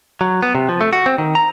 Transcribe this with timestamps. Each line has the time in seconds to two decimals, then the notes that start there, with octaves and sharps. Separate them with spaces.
0.21 F#3
0.43 B3
0.55 C3
0.69 F3
0.81 A3
0.93 F#4
1.06 C4
1.18 D#3
1.35 A#5